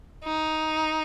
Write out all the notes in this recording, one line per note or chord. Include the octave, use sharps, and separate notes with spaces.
D#4